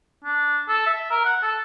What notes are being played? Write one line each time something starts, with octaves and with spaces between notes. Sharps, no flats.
D4
A4
E5
A#4
F#5
A4